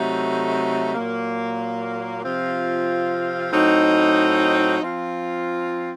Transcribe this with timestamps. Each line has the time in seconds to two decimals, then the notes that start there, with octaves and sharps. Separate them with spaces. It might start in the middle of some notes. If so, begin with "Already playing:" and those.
Already playing: C3 F#3 A3 D#4
0.95 A#2 F#3 A#3
2.23 C3 F3 C4 F4
3.52 A2 F#3 C4 D#4
4.81 F3 C4 F4